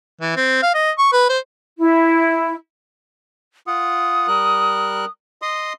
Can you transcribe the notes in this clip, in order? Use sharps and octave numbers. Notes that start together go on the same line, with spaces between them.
E3
C4
F5
D#5
C#6
B4
C5
E4
F4 F#5 D#6
G3 A#4 F#6
D#5 C6 D#6